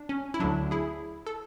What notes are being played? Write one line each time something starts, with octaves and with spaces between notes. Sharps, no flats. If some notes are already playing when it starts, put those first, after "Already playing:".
Already playing: D4
C#4
E4
D2 D3 F#3 D4
E4 G#4
A4